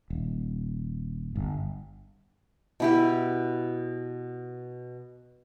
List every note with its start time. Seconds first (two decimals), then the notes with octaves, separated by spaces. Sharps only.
0.10 D#1
1.36 G1
2.80 B2 E4 G4